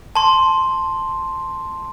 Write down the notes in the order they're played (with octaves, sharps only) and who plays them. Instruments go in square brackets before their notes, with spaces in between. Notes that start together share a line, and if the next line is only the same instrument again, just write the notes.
[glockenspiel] A5 C6